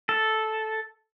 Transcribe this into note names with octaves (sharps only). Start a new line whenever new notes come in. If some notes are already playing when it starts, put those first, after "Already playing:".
A4